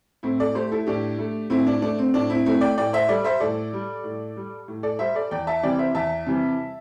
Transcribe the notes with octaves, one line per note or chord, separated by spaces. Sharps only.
A2 C4 E4
A4 D5
A3 G4 C5
E4 A4
A2 D4 G4
A3
A2 C4 E4
D4
A3 D4
C4
A2 D4
C4 E4
A3 C4 E4
D5 G5
A2 D5 G5
C5 E5
G3 A4 D5
C5 E5
A2 A4 D5
G3
A2
G3
A2
A4 D5
G3 C5 E5
A4 D5
E2 D5 G5
E5 A5
C3 E3 G3 D5 G5
C5 E5
E2 E5 A5
C3 E3 G3